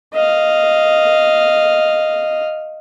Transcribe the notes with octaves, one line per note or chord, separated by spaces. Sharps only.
D#5 F5